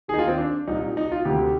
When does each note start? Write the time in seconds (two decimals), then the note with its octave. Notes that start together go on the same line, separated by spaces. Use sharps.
0.08 D#3 G#4
0.12 D#2 D#4
0.19 F4
0.28 C4
0.37 D4
0.67 C2 A#2 D#4
0.97 D#4
1.12 F4
1.25 D2 C3 D#3 G4